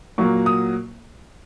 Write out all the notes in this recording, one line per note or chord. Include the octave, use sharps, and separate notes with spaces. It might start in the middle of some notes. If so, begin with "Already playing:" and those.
A#2 F#3 A#3 C#6
D#6